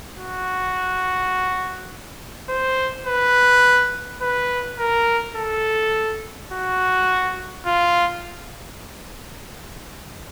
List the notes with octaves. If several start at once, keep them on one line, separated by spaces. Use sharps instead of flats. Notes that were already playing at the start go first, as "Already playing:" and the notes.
F#4
C5
B4
B4
A#4
A4
F#4
F4